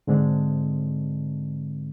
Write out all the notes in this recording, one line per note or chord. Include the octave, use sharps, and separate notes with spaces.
G#2 D3 G#3 C4 D4